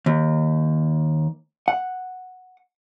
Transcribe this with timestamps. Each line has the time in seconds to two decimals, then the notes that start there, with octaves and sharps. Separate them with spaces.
0.06 D#2
1.68 F#5